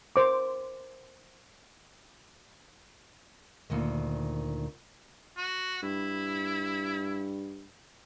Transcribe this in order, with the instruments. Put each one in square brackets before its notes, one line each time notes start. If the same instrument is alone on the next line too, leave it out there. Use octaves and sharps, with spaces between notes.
[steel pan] A#4 C5 D6
[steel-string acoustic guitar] D2 A#2 D#3
[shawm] F#4
[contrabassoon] G2 [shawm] E4